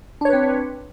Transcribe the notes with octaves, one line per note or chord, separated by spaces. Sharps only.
C4 D4 B4 C#5